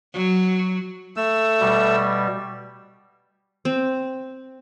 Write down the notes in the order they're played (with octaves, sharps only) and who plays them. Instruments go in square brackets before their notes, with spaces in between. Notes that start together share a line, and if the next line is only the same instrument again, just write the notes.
[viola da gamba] F#3
[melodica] A3 E6
[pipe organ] B2 G3
[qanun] C4